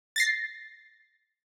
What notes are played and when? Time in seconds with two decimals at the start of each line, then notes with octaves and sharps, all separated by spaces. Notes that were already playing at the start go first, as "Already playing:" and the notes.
0.16 A6 A#6 C7